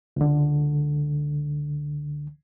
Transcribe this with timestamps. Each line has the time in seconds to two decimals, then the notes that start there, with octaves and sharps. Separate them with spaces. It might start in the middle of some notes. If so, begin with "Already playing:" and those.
0.16 C#2 D3